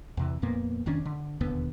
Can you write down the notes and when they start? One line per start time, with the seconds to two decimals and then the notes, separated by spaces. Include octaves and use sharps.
0.17 E2 C3 E3
0.42 F2 A#2 A#3 B3
0.86 F1 D#3 C#4 D4
1.05 D3
1.41 E1 D#2 D3 B3